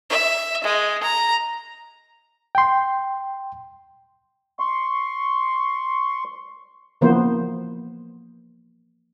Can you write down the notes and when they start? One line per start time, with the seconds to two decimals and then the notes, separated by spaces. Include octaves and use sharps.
0.10 E5
0.64 G#3
1.03 A#5
2.55 G5 C6
4.59 C6 C#6
7.01 C#3 E3 F3 A#3 B3 C5